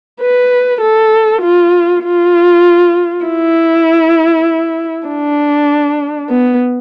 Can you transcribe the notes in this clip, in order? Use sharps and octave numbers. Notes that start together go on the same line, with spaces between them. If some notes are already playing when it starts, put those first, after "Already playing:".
B4
A4
F4
F4
E4
D4
B3